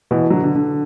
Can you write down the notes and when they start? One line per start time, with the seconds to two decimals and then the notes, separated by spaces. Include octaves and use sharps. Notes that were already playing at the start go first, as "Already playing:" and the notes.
0.11 B2 E3
0.30 D3 F#3
0.43 D3
0.55 D3